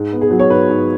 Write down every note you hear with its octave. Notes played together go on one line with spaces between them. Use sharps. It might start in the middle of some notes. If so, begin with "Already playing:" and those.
Already playing: G#2
B3
G#4
F#3
C#5
G#2 B4
G#2